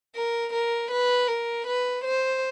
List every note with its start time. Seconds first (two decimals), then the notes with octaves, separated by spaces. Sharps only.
0.15 A#4
0.53 A#4
0.91 B4
1.28 A#4
1.67 B4
2.04 C5